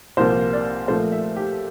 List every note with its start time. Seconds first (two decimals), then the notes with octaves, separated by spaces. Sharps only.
0.17 C2 A#2 F3 A#3 C5
0.53 D5
0.88 A#2 F3 A3 C5
1.12 E5
1.36 G4